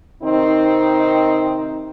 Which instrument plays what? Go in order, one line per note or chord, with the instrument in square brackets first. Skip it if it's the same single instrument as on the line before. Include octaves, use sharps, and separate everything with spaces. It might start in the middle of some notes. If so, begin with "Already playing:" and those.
[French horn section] C3 D#3 C4 D#4